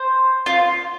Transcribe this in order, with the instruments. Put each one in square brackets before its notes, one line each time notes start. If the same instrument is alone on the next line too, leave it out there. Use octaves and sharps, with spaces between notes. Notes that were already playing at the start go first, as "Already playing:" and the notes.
Already playing: [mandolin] C5
F4